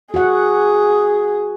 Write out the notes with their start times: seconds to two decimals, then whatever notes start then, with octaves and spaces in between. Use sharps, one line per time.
0.14 F#4 G#4 F#5